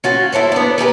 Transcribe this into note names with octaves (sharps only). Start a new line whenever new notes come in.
C#4 F4 F#4
E4 A4 C5 C#5
B3 D4
G4 G#4 A#4 B4